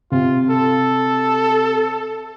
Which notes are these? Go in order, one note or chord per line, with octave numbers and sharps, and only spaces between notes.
C3 F4
A4